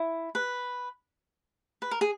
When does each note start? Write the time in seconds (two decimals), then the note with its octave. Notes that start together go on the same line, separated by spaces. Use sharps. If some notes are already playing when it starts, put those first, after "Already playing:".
Already playing: E4
0.35 B4
1.82 B4
1.91 A#4
2.01 G#4